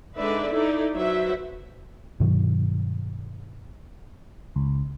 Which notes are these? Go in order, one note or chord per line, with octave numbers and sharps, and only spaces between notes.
D3 G#3 D#4 B4 D5 E5
D#4 E4 A4 D5
F#3 F#4 B4 C5 E5
G2 B2 D#3 F#3
C#2